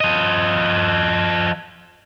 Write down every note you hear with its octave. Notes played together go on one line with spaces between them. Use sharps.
F3 D#5